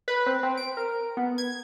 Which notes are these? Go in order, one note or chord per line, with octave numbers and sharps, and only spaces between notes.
B4
C4
C4
D7
A#4
B3
G#6